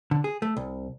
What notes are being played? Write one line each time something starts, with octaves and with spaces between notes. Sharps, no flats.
D3
G#4
A3
C2